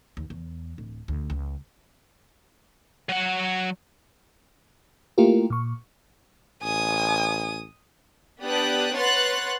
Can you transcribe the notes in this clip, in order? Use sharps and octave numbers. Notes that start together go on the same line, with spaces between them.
D#2
E2
D1
D2
C#2
F#3 F#5
A3 A#3 E4 F4 G4 A#4
A#2 C#6
A1 G#5 D#6
B3 D4 G4 D5 D#6 F#6
B4 C#5 F#5 C6 F#6 A6